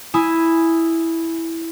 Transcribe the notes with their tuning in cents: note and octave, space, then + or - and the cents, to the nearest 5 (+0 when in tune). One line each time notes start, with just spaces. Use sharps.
E4 +0 G#5 +0 D#6 +0